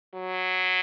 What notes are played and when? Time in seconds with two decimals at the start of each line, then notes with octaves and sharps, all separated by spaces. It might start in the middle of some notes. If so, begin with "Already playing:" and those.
0.14 F#3